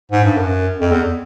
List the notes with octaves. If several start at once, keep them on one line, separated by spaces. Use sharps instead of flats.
G#2
G2
F#2
F2
E2